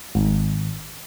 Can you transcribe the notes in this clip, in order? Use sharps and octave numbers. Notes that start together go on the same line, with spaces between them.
G#1